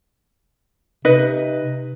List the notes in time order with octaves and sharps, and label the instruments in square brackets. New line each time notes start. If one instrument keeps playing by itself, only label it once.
[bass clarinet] C3 [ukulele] D#4 B4 D#5